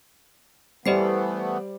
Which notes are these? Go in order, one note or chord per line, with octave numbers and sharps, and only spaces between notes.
E3 G3 A3 B3 G4 C5 D5 C7